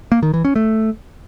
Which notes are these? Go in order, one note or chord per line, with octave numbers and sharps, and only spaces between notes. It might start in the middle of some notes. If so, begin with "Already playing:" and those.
A#3
D#3
E3
C#4
A3